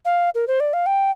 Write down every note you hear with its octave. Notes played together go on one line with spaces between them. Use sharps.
F5
A#4
C5
D5
F5
G5